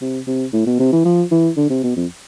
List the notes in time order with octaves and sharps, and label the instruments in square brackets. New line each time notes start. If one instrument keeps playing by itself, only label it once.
[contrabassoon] C3
C3
A2
B2
C3
E3
F3
E3
D3
C3
B2
F2